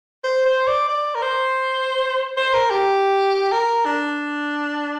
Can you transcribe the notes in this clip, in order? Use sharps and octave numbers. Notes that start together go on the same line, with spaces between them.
C5
C5
D5
D5
A#4
C5
C5
A#4
G4
A#4
D4